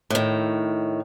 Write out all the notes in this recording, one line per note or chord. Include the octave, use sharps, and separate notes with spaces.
A2 D#3